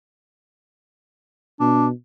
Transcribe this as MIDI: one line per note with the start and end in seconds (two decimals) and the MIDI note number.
1.60 1.91 47
1.60 1.87 62